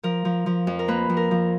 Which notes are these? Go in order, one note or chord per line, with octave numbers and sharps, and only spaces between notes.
F3 A#4
F3
F3
F2
A#4
A#3 B4
F2
A#4
F3